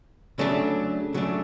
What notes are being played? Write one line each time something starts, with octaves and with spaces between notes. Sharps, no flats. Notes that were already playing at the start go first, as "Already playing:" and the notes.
C#3 F#3 A3 D4
C#3 F#3 A3 D4